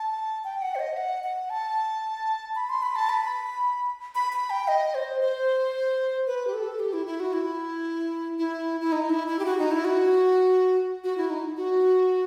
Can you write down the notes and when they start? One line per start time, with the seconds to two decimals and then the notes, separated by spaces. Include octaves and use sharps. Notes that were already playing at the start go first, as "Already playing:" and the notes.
Already playing: A5
0.44 G5
0.62 F#5
0.75 C5
0.79 D#5
0.97 F#5
1.24 F#5
1.50 A5
2.55 B5
2.69 C6
2.82 B5
2.96 A5
3.09 B5
4.15 B5
4.33 B5
4.50 G5
4.68 D#5
4.95 C5
5.21 C5
6.27 B4
6.47 G4
6.54 A4
6.80 G4
6.93 E4
7.06 E4
7.20 F#4
7.33 E4
8.39 E4
8.81 E4
8.92 D#4
9.09 E4
9.27 E4
9.39 G4
9.45 F#4
9.58 D#4
9.71 E4
9.85 F#4
11.04 F#4
11.17 E4
11.30 D#4
11.57 F#4